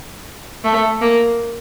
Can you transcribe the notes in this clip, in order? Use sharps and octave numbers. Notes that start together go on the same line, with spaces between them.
A3
A#3